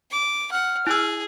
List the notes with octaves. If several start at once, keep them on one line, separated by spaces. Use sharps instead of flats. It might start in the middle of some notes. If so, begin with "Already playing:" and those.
D6
F#5 F6
E4 G#4 E6